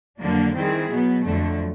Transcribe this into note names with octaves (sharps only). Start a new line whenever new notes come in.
F2 D3 F#3 A#3 D4
D#3 G3 C4 E4 G#4
B2 F#3 B3
F2 D3 F#3 A3